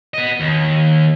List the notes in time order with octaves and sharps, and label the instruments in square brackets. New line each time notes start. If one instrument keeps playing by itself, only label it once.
[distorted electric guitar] B3 D#5
D#2